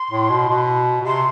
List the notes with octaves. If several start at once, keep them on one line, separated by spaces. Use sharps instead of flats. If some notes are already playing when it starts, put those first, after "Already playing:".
Already playing: C6
A2
B2
B2
B2
C3 C6